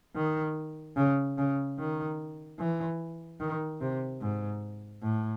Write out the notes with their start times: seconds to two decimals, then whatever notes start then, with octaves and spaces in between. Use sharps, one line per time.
0.15 D#3
0.97 C#3
1.38 C#3
1.78 D#3
2.59 E3
3.40 D#3
3.81 C3
4.21 G#2
5.03 A2